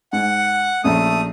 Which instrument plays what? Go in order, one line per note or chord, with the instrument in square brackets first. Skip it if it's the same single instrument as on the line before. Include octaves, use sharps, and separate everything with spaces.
[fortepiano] G#2 [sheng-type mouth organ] F#5
[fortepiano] A#1 C#4 [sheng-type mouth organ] A3 D#6